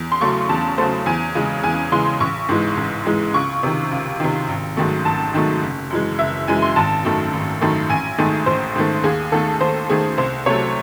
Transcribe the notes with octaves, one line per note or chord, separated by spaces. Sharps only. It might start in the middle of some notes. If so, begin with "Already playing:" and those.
Already playing: E2
C6
C#3 F#3 A3 C#6
E2 A5
C#3 F#3 A3 C5
E2 G#5
C#3 E3 G#3
E2 G#5
C#3 E3 G#3 C6
A1 C#6
G#2 E3 G#3
A1
G#2 E3 G#3
C#2 C#6
C3 D#3
C#2
C3 D#3
G#1
G#2 D#3 F#3 A3
G#1 A5
G#2 D#3 F#3 A3
F#1
F#2 E3 G#3
F#1 E5
F#2 E3 G#3 G#5
C6
G#1 A5
F#2 D#3 A3
G#1
F#2 D#3 A3
A1 G#5
G#2 D#3 A3
A1 C5
G#2 D#3 A3
D#2 G#4
D#3 A3 A4
D#2 C5
D#3 A3 G#4
C2 C5
C3 F#3 A3 C#5